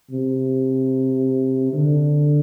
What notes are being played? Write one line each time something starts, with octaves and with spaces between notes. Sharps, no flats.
C3
D3